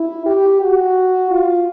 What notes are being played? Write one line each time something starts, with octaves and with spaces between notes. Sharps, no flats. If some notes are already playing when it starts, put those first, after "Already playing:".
Already playing: E4
G4
F#4
F4